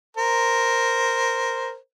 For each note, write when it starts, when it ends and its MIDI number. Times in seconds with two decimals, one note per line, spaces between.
0.17 1.76 70
0.17 1.76 72